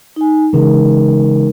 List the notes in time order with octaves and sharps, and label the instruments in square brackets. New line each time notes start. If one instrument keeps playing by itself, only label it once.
[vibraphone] D#4 G#5
[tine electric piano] C#3 E3 [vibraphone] G#3 D#4 A#4